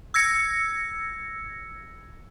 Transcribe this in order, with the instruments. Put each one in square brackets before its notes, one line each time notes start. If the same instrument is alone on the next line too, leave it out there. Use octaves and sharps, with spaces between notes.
[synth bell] E6 G#6 A#6 C#7